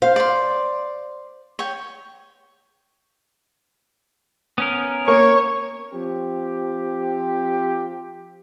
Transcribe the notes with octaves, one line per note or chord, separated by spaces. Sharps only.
C5 F5
D5 C6
C#5 G5
B3 C#4 A#4
A#3 C#5 C#6
F3 C4 G4